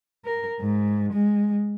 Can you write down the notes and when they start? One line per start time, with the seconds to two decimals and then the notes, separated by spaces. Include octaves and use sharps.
0.25 A#4
0.60 G#2
1.13 G#3